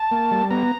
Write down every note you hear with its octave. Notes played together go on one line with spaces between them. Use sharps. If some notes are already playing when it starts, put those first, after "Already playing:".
Already playing: A5
A#3
G3
B3 A#5